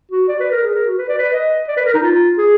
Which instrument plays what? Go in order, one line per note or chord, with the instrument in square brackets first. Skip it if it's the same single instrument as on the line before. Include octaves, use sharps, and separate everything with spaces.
[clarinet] F#4
D5
B4
A#4
G#4
A#4
F#4
B4
D5
B4
D#5
D5
B4
A#4
D#4
F4
G#4